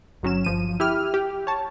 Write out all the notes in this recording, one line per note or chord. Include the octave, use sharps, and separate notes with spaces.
G1 F#3 C#4 E7
G1 F3 D#7
E4 G4 F6
G4
C#5 A5